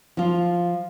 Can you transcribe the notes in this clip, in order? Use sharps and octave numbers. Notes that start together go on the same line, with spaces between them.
F3 F4